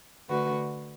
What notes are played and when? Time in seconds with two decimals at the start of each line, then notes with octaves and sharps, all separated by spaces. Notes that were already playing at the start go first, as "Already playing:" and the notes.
0.28 D3 A3 F#4 B4